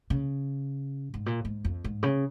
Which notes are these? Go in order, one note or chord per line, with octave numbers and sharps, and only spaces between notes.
C#3
G#2
A#2
G#2
F2
G#2
C#3